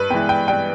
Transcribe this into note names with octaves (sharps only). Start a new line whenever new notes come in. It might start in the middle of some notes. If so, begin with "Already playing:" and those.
Already playing: G2 B4
E3 G#3 B3 G5
G5
G2 G5